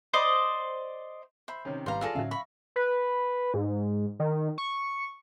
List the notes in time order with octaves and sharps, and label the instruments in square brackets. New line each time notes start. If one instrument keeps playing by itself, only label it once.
[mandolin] C5 D5 D#5
[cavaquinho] C5 [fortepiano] E5 B5
[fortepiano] C3 D#3 [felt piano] C#4
[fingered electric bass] G#1 [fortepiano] G3 [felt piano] B4 F5 [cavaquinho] A#5 C6
[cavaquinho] F4 G#4 A4 [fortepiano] D5 F5 [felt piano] E6 A#6
[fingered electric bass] A2 D3 C#4 [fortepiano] F#3 F5 [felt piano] E5
[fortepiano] F5 C#6 [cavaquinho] B5
[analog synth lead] B4
G#2
D#3
C#6